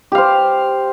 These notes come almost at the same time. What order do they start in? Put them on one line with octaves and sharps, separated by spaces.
G4 F5 C5